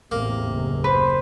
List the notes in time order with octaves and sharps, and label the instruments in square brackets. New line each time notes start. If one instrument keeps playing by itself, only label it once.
[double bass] A1 E2 [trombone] C3 [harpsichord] A#3
[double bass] F#1 D#2
[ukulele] B4 [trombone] C5